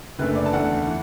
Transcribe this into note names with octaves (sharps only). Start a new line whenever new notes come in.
F#1 F#2 D3 A3 B4
D5
A5
E2 D3 A3 F#5
E3